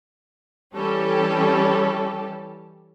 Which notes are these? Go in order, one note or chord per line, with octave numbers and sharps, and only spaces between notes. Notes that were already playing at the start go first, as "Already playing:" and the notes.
E3 G3 C#4 G4 A4